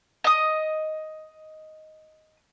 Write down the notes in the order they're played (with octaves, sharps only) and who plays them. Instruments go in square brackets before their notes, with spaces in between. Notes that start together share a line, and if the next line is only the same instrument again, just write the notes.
[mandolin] D#5 D#6